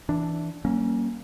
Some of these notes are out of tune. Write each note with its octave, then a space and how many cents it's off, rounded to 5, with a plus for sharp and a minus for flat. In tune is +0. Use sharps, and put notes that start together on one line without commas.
E3 -5 D4 +0
G3 -45 A#3 +0 C#4 +0